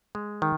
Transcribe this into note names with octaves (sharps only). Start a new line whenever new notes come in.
G#3
D#3